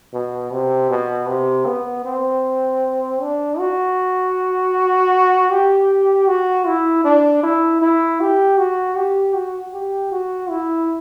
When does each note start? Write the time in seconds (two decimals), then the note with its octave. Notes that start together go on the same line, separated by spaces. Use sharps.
0.14 B2
0.52 C3
0.90 B2
1.28 C3
1.66 B3
2.05 C4
3.21 D4
3.59 F#4
5.51 G4
6.28 F#4
6.67 E4
7.05 D4
7.43 E4
7.82 E4
8.20 G4
8.58 F#4
8.97 G4
9.35 F#4
9.74 G4
10.12 F#4
10.50 E4